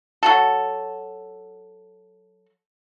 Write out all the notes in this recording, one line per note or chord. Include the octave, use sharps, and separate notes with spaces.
F#3 F#4 A4